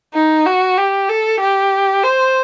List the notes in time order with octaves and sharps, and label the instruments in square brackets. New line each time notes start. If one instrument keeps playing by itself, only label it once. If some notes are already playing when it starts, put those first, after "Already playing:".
[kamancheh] D#4
F#4
G4
A4
G4
C5